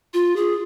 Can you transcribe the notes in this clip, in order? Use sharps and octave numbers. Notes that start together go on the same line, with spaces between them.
F4
G#4